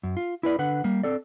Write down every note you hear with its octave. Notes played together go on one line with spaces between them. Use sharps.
F#2
F4
E4 B4 D5
D3 B4 F#5
G3 A#3
C4 A4 D5